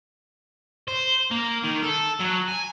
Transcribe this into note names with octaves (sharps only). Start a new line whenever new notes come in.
C5
A#3
D#3
A4
F#3
G#5